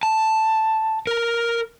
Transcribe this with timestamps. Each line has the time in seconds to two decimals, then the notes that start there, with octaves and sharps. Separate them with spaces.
0.03 A5
1.07 A#4